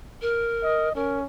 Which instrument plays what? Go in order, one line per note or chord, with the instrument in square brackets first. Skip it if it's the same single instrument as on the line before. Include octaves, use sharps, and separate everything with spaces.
[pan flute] A#4
[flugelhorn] D#5
[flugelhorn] C#4 [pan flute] A#4